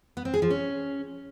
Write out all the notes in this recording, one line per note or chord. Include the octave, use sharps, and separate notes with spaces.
B3
C4
G#4
F3
C#4